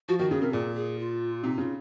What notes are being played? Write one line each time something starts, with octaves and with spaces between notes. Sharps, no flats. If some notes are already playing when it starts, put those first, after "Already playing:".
F3 F#4
D#3 F#4
C#3 G#4
C3 A#4
A#2 G#4
G#4
F4
C3 D#4
C#3 F4